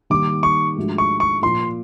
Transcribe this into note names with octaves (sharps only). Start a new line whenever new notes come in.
D#3 G3 A#3 D#4 D6
C#6
G#2 F3 A3 D4 F#4
C#6
C#6
A#2 F3 A#3 C6